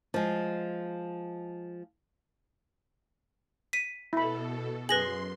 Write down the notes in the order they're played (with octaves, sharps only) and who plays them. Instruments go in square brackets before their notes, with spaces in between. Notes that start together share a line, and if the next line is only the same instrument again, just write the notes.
[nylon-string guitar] F3 G#3
[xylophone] B6 D#7
[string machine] B2 A4 [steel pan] E4 B5
[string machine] F#2 C6 [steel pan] G#4 G#5 [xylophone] B4 A#6 F#7